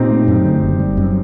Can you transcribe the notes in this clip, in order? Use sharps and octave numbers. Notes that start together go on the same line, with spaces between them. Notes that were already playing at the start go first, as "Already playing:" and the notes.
Already playing: A#2 C4 D#4 G4
A3
F#2
D3
F#1
G3
F#2